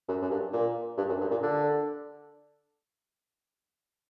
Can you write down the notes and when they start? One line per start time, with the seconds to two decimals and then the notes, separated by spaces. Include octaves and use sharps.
0.08 F#2
0.22 F#2
0.31 G2
0.53 A#2
0.97 G2
1.08 F#2
1.21 G2
1.31 A#2
1.43 D3